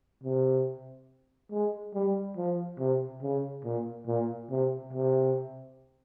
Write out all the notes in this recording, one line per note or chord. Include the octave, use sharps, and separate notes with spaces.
C3
G#3
G3
F3
C3
C#3
A#2
A#2
C3
C3